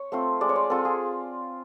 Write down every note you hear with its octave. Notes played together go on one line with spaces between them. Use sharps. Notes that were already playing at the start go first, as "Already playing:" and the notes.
Already playing: C#5
A3 C4 F4
G#3 D5
C#5
D5
C4 F4 A4
G#4